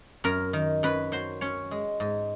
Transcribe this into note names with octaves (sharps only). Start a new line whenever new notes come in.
F#2 A#4
D#3
F#2 B4
F#3 C5
C#4 C#5
G#3
G#2